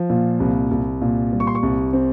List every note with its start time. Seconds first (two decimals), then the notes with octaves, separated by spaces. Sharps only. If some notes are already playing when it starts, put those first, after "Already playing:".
Already playing: F3
0.10 A#2
0.40 C2
0.71 C2
1.02 A#2
1.32 G3
1.40 C#6
1.47 C6
1.55 C#6
1.63 C2
1.93 C4